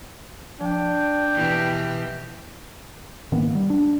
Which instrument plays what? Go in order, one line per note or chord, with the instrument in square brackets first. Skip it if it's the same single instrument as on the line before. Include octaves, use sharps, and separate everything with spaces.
[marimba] F3 [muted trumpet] D4 [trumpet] G5
[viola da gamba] B2 E3 G4
[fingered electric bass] G#2 D#3 A#3 B3
G3
D4